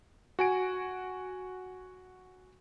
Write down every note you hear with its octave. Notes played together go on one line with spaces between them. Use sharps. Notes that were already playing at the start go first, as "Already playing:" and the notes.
F#4 G#5 D7